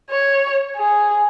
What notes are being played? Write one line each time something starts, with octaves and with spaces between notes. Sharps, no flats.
C#5
G#4